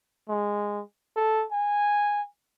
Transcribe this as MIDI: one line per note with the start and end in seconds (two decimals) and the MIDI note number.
0.29 0.81 56
1.16 1.45 69
1.52 2.22 80